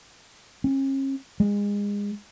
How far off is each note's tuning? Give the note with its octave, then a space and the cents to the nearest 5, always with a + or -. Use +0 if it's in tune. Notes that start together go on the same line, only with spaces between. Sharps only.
C#4 -40
G#3 -30